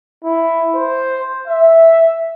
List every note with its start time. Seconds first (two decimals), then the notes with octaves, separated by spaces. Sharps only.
0.24 E4
0.76 C5
1.47 E5